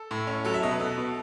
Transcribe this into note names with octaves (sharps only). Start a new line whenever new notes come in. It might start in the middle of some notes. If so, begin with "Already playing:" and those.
Already playing: A4
A2
C#4
F#3 A4
E5
B2 D#5
B4
B2 A4
B2